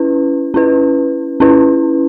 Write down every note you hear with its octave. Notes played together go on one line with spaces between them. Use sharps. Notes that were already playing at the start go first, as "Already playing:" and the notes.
Already playing: C#4 E4 B4
C#4 E4 B4
C#4 E4 B4